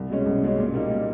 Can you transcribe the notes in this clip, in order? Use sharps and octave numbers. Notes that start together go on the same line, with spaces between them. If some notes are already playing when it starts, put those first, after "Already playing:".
Already playing: C2
B2 G#3 C#4
C2
B2 G#3 C#4
A#2
G3 A#3 D#4
A#2